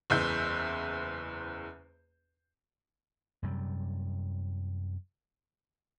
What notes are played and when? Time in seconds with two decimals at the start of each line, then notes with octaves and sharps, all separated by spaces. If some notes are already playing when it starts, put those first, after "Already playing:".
0.10 F#1 E2 G#3 E5 G6
3.43 F#2 C3 G3